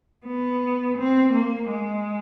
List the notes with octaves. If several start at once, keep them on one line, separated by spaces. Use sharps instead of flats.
B3
C4
A#3
G#3